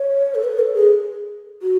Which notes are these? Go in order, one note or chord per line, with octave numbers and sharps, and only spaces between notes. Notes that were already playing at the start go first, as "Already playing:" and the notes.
Already playing: C#5
A4
B4
A4
G#4
F#4